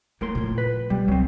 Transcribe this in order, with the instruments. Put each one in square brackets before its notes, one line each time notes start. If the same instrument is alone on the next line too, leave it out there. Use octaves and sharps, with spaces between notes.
[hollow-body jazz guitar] A2 A#4 C6 [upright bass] A#3
[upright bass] A#2 F3
[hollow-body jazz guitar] B4
[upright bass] B2 [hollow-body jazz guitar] G3
[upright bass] C#2 [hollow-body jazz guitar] F#3 C4